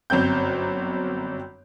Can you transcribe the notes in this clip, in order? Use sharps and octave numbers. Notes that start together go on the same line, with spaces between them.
G1 F#2 C4 G6